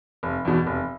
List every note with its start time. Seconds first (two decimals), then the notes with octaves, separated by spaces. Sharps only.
0.23 F1
0.45 E2 B2
0.67 F1